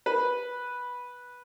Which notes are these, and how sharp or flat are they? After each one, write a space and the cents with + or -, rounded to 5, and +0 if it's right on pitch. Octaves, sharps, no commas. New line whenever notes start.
B4 -10